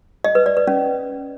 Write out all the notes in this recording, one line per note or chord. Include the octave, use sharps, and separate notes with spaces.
D#5
B4
D5
B4
C#4